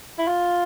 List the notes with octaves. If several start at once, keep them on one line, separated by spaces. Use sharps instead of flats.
E4
F4